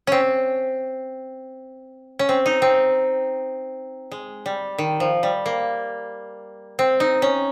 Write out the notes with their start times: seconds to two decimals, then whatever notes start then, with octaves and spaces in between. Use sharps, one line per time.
0.07 C4 C#4
2.19 C#4
2.29 C4
2.46 D#4
2.62 C4
4.11 G#3
4.46 G3
4.78 D#3
5.00 F3
5.23 G3
5.46 A#3
6.79 C4
7.00 D#4
7.22 C#4